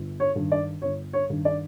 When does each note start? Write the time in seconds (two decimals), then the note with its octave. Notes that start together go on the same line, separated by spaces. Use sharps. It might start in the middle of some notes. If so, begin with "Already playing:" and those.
Already playing: G1
0.20 C#5
0.35 G2 D#3
0.52 D5
0.82 G1 C#5
1.13 C#5
1.30 G2 D#3
1.45 D5